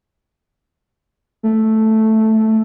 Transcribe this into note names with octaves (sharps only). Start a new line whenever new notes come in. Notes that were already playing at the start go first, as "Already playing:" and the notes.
A3